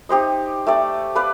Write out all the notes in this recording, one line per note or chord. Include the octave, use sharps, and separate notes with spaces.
D#4 G4 C5 D#5
A3 G4 D5
B4 D5 F5 B5